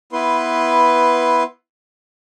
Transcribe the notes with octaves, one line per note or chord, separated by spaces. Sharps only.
B3 E4 B4 C6